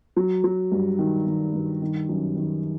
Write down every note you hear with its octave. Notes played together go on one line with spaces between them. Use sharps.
F#3
F#3
G2
D#3
D#3
G2
D#3
F#2
D#3